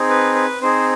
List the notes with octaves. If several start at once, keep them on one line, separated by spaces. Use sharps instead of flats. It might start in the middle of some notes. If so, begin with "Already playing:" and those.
Already playing: C4 D#4 G#4
B4
B4
C4 D#4 G#4 C5